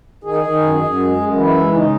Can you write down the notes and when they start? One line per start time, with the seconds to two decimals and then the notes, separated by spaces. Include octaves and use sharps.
0.24 D#3 G#4
0.43 D#3
0.62 F#2
0.81 F#2
0.99 G#3
1.17 F#2
1.35 E3 E4
1.55 G#3
1.73 C#3 D#4